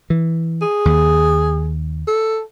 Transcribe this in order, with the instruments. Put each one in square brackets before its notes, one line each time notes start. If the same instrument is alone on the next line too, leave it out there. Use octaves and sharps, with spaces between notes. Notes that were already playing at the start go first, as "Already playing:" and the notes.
[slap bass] E3
[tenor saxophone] G#4
[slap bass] D#2
[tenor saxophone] A4